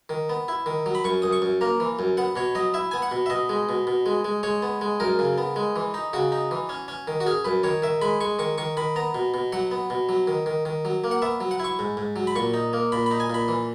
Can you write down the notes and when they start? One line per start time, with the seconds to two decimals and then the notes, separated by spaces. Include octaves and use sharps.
0.09 D#3
0.29 B3
0.48 E4
0.66 D#3
0.86 F#3
0.95 B5
1.04 F#2 C#6
1.22 F#2 D#6
1.33 C#6
1.42 F#2
1.61 A#3 A#5
1.80 E3
1.99 F#2
2.17 B3 F#5
2.36 B2 C#5
2.55 F#3 D#5
2.74 E4 E5
2.91 B3 G#5
3.02 F#5
3.11 B2
3.26 E5
3.30 B2 D#5
3.49 G#3
3.69 B2
3.87 B2
4.06 G#3
4.25 G#3
4.43 G#3 C#5
4.62 B3
4.81 G#3
5.00 F#2 A#4
5.19 C#3
5.38 B3
5.56 G#3
5.76 E3
5.94 D#4
6.13 C#3 F#4
6.32 D#4
6.51 E3
6.69 C#4
6.88 C#4
7.08 D#3
7.20 F#4
7.26 C#4 G#4
7.45 F#2 B4
7.63 D#3 C#5
7.82 D#3 E5
8.02 G#3 B5
8.21 G#3 C#6
8.39 D#3 C#6
8.58 D#3 C#6
8.77 D#3 B5
8.96 B3 A#5
9.15 B2
9.34 B2
9.52 F#3 F#5
9.71 B3
9.90 B2
10.09 F#3
10.27 D#3
10.46 D#3
10.65 D#3
10.85 F#3
11.04 A#3
11.11 F#5
11.22 B3 E5
11.40 F#3
11.51 F#5
11.60 E4 C#6
11.79 G#2
11.97 G#2
12.16 F#3
12.27 B5
12.35 A#2 C#6
12.54 D#4
12.73 A#3
12.92 A#2 B5
13.06 D#4 B5
13.20 G#5
13.30 A#2 B5
13.48 E3